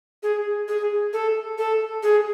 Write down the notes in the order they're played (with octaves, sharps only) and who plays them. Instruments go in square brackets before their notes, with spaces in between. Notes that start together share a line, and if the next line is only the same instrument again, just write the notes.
[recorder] G#4
G#4
A4
A4
G#4